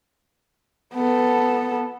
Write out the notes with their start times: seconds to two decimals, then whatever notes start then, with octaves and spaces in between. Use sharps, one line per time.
0.95 B3 A4